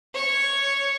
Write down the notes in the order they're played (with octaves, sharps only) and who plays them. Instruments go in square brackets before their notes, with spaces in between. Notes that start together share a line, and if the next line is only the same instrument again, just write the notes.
[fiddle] C#5